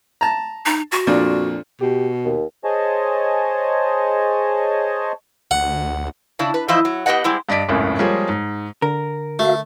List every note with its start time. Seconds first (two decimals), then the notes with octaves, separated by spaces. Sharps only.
0.21 A5 A#5
0.66 D#4
0.92 F#4
1.07 F2 A#2 D4
1.81 B2 G4
2.25 D#2
2.64 G#4 C5 C#5 D#5 G#5 A5
5.51 D2 F#5
6.39 C#3 D4 E4
6.54 B4
6.68 E3 F3 E4 C5 D#5 E5
6.85 F#3
7.06 B3 G4 B4 D#5 F#5
7.24 G3 G#3 C4 E4
7.49 G2 D5 D#5 B6 D7
7.69 G#1 C#2 F#2 A2
7.99 F3 G3 G#3 A#3 G#4 C#5
8.29 G#2
8.82 D3 A#4
9.39 A3 F#4 E5 F5